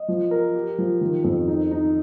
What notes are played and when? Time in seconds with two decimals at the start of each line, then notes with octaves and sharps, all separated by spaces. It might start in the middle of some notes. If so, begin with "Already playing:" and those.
Already playing: D#5
0.08 F3
0.31 A#4
0.55 G4
0.78 F3
1.01 D#3
1.24 F2
1.48 D#4
1.71 D#4